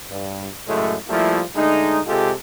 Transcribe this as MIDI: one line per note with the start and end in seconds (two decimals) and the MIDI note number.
0.10 0.47 43
0.68 0.95 42
0.68 0.95 45
0.68 0.95 49
0.68 0.95 56
0.68 0.95 57
1.09 1.42 53
1.09 1.42 55
1.09 1.42 57
1.09 1.42 58
1.09 1.42 64
1.09 1.42 65
1.55 2.01 50
1.55 2.01 56
1.55 2.01 57
1.55 2.01 63
2.07 2.32 48
2.07 2.32 56
2.07 2.32 65
2.07 2.32 67
2.07 2.32 69